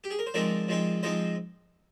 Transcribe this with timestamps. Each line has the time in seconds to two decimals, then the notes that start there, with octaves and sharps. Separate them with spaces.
0.04 G4
0.10 G#4
0.19 A#4
0.27 C5
0.34 F3 G#3 C4 D#4 A#4 D5
0.69 F3 G#3 C4 D#4
1.03 F3 G#3 C4 D#4 C5 D#5